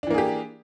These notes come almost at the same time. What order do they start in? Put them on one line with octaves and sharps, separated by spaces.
D4 E3 A#3 G#4 G4